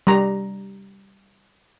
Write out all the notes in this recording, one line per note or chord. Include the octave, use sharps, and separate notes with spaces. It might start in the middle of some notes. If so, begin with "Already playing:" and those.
G3 A#5